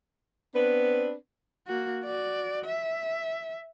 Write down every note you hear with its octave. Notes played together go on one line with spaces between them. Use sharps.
B3 C4 D4 B4
A#3 F#4
F#4 D5
E5